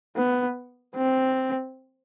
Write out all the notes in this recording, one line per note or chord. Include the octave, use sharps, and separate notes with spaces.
B3
C4